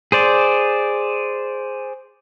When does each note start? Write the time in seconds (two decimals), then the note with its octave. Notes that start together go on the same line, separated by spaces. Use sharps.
0.12 G#4 C5 D5